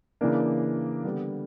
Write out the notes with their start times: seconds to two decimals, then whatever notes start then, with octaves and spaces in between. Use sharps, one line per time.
0.21 C#3 E3 A#3 D4
1.05 D3 G3 B3